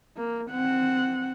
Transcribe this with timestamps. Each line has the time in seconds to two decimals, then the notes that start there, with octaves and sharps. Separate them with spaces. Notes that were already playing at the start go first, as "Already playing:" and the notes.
0.16 A#3
0.50 C4 F#5